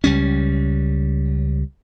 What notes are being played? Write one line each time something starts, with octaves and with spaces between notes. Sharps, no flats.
C#2 G3 C#4